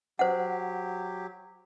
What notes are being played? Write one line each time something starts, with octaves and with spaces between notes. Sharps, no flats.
F#3 G4 C5 F#5